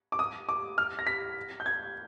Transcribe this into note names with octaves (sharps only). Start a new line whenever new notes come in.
D6
D#6
D6
F6
A#6
B6
G6
G#6